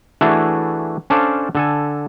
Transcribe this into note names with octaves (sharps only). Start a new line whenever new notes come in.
E3 A3 D4 E4 F#4 G#4
C#4 D4 A4 C5 D5 F5
D3 A4 G#5